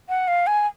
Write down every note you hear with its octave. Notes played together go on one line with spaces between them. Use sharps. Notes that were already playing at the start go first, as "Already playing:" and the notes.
F#5
F5
G#5